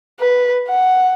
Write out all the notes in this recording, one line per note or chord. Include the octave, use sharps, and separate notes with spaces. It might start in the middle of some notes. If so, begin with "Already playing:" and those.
B4
F#5